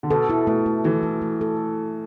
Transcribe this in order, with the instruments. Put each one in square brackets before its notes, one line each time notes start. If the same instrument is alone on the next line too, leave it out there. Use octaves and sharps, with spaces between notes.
[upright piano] D3
[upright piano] B2 [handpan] A4
[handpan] E4
[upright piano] B2 [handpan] A3
[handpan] A3
[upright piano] E3 [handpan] A4
[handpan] A3
A3
A4